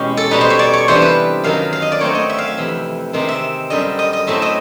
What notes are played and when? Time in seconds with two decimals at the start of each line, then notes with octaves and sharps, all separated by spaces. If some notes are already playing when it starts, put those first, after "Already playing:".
Already playing: E2 B2 G#3 C#4 G4
0.17 A4
0.31 B2 G3 B3 D#4 B4
0.41 C5
0.50 C#5
0.59 D5
0.73 C#5
0.88 C3 E3 G3 B3 D4 C5
1.02 B4
1.44 F#2 D#3 F#3 F5
1.73 F5
1.82 D#5
1.92 D5
2.00 D3 F#3 A3 C4 D#4 C#5
2.15 D#5
2.30 E5
2.38 F5
2.48 E5
2.58 F2 C3 E3
3.13 C3 D#3 G#3 C4 D#4
3.29 E5
3.70 F#2 D3 G3 C4 D#5
3.99 D#5
4.13 D#5
4.27 A2 F#3 A3 C4 E5
4.42 D#5